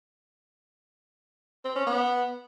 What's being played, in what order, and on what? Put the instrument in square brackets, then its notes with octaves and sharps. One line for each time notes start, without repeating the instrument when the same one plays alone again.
[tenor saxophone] C4
C#4
B3